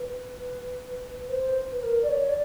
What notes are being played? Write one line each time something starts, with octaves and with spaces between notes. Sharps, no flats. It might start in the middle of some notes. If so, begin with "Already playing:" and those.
Already playing: B4
C5
B4
A#4
D5
C#5
D5